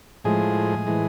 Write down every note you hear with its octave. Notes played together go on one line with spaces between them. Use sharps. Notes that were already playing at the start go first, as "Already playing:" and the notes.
A2 F3 G#3 G#4
A2 E3 G#3